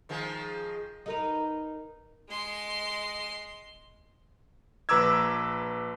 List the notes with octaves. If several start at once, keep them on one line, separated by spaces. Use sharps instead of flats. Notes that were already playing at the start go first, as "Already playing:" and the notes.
D#3 F3 G#3
D#4 A#4 B4
G#3 C6
A#1 B4 A#5 D6 E6 G#6